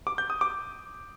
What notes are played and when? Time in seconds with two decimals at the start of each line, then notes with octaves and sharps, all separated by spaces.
0.07 D6
0.18 G6
0.30 D#6
0.41 D6